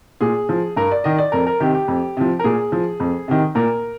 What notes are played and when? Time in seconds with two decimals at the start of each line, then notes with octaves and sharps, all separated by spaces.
0.21 A#2 G#4
0.49 F3
0.76 G2 A#4
0.91 D5
1.04 D#3 D#5
1.18 D5
1.32 F2 A#4
1.46 A#4
1.60 C3 D#3 G4
1.75 G4
1.88 F2
2.17 C3 F3
2.39 A#4
2.44 A#2 G#4
2.72 F3
3.00 F2
3.28 C3 D#3
3.55 A#2 A#4